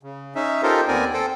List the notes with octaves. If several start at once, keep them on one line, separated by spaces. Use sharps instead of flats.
C#3
C#4 D#4 E5
D#4 F4 G4 A4 A#4 C5
D#2 B3 C4 A#4 D5 G#5
A4 C5 G5